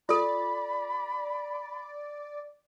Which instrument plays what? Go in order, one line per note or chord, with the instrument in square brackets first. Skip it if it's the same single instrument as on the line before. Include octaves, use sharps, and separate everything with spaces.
[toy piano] F4 A4 [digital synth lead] D5 [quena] B5